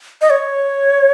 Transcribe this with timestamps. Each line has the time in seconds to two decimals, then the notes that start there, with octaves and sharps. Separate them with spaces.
0.21 D#5
0.30 C#5